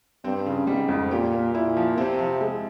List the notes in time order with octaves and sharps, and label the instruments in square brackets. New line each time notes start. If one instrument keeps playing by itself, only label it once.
[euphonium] G2 [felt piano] C4
[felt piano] C#3
[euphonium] G#2 [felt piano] G3
[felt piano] F2
[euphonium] A#2 [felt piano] G4
[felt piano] A#3
[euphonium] A#2 [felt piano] E4
[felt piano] F3
[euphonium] C3 [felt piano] C4
[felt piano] F3
G#3